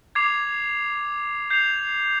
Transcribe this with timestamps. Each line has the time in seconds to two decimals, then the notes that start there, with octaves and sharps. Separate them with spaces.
0.15 D6 G#6 C7 F7
1.50 G6 C7 F7